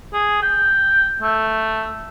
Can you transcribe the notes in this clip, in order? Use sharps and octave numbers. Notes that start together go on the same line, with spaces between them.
G#4
G5
A3